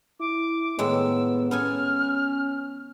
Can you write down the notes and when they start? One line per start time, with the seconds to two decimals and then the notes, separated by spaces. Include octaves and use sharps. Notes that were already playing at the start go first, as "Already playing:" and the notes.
0.20 E4 D6
0.79 A2 D#3 G#3 B3 E6
1.51 B3 C#4 A4 G#5 F6